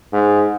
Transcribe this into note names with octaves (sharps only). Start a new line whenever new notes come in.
G#2